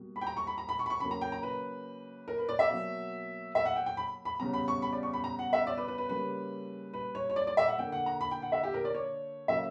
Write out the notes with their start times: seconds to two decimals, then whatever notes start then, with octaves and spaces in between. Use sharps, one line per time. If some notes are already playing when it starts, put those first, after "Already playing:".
Already playing: B2 G3 A#3
0.16 B5
0.21 G5
0.27 A#5
0.37 C#6
0.47 B5
0.58 A#5
0.69 B5
0.79 C#6
0.86 B5
0.90 C#6
1.00 C#3 F#3 A#3 B5
1.11 A#5
1.21 G5
1.32 A#5
1.43 B4
2.28 A#4
2.38 B4
2.49 D5
2.59 E5
2.70 B2 F#3 A#3
3.55 E5
3.65 F#5
3.76 G5
3.86 G5
3.97 B5
4.25 B5
4.40 C#3 G3 B3 A#5
4.54 B5
4.68 C#6
4.82 B5
4.93 D5
5.03 C#6
5.13 B5
5.24 A#5
5.39 F#5
5.53 E5
5.67 D5
5.77 B4
5.88 B4
5.98 B4
6.09 C#3 G3 A#3 B4
6.93 B4
7.15 C#5
7.30 C#5
7.36 D5
7.47 D5
7.57 E5
7.68 F#5
7.79 D3 A#3 G5
7.92 F#5
8.06 A#5
8.21 B5
8.31 G5
8.42 F#5
8.52 E5
8.63 G4
8.74 A#4
8.85 D5
8.95 C#5
9.48 C#3 F#3 A#3 E5